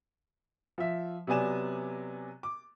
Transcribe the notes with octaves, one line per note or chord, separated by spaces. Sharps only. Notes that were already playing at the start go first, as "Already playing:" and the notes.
F3 E5
C3 F#3 B3 D5 G#5 E7
D6